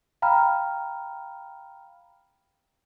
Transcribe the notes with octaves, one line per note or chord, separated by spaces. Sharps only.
F5 G5 A#5 B5 F6